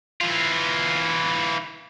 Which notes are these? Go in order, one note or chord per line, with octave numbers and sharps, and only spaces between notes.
E3 F4